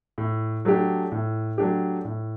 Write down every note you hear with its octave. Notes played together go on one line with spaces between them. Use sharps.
A2
F#3 A3 D4 G4
A2
F#3 A3 D4 G4
A2